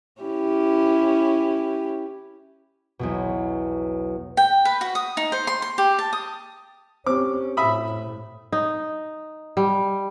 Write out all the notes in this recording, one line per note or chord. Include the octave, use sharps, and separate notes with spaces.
C#4 E4 G4
B1 E2 B2
G5
B4
F#4
D#6
D#4
C5
C6
C6
G4
A5
D#6
C4 C#4 G4 C5 D6
A2 E5 B5 D#6
D#4
G3